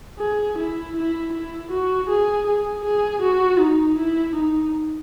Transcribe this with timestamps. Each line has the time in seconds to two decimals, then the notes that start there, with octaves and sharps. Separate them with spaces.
0.20 G#4
0.58 E4
0.96 E4
1.33 E4
1.71 F#4
2.09 G#4
2.46 G#4
2.84 G#4
3.22 F#4
3.59 D#4
3.97 E4
4.35 D#4